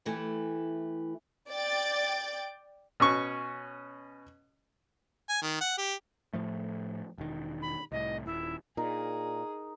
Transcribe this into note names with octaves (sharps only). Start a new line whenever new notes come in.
E3 A3 E4 G4
D5 G5 D6 A6
B2 C#4 C#6
G#5
D#3
F#5
G4
A2 F3 A3
E1 D#3
B5
C2 A2 D#5
D#1 E4
A#2 D#4 G#4 A#4